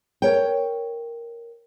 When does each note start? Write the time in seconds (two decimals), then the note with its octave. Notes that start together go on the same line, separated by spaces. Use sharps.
0.22 A#4 C#5 G5